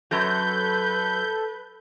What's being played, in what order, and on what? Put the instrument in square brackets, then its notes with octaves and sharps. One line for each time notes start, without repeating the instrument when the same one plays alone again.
[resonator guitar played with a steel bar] F#2 F#3 [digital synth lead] A4 [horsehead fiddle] B4 [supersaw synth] G6